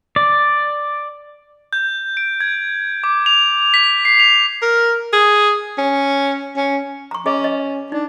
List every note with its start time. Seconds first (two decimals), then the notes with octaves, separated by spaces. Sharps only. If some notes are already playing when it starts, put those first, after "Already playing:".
0.16 D5
1.73 G6
2.17 D7
2.41 G#6
3.04 D6
3.26 F7
3.74 B6
4.05 C7
4.19 F7
4.62 A#4
5.13 G#4
5.78 C#4
6.57 C#4
7.11 A#5 C#6
7.26 C#4 G#4 D#5
7.44 D#5
7.92 D4 D#4